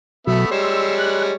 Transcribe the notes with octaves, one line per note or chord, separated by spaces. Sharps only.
B2 F#3 A3 B3 E5
G3 G#3 C#5 C6 E6
F#6